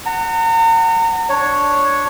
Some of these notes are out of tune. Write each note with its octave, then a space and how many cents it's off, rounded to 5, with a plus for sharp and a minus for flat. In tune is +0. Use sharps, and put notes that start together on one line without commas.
F#5 +5 A#5 -40
D4 +0 C#5 +0